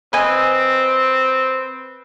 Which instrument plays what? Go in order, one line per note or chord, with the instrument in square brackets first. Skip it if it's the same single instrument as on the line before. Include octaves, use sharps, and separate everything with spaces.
[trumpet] C4 [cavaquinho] B4 D#5 G#5